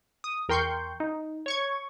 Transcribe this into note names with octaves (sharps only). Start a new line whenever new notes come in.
D#6
E2 A#4 G5 C6 C#6 G6
D#4
C#5 C#6 G#6